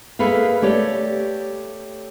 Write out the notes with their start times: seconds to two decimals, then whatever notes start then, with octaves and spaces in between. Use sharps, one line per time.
0.19 A#3 G#4 A4 B4 E5 F5
0.62 A3 G4 C#5 D5